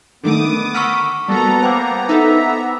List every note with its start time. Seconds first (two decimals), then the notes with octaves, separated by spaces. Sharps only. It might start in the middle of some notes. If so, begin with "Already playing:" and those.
0.24 D3 D#3 A3 B3 D6 D#6
0.75 F#5 A#5 C#6 E6 F6 B6
1.28 G3 A#3 B3 F#4 A4 A#5
1.63 A#3 C5 G5 D6 F#6
2.09 D#4 A4 E5